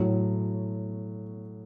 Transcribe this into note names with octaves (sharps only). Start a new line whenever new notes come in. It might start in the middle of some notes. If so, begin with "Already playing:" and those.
Already playing: A2 F#3 C#5